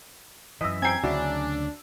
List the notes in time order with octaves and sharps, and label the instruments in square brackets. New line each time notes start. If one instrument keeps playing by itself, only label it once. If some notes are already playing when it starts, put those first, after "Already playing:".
[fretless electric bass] F#2 E3 [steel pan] D#5 [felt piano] E6 B6
[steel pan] C4 G5 [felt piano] G#5 A#5 C7 [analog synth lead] G#6
[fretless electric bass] D2 C#3 F#3 [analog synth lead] D4 [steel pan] E4 F#4